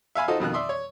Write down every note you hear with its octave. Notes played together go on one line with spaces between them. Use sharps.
E5 F5 G#5 B5
D#4 F4 F#4 A4 C5 D#5
F2 B2 D#3 F#6
D5 E5 C6 D#6
C#5